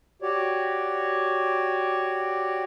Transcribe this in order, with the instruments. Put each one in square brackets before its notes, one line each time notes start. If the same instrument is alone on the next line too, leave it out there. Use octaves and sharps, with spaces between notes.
[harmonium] F#4 G4 C#5 D5